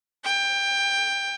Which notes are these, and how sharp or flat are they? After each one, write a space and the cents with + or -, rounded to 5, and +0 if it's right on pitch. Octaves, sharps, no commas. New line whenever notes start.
G5 +20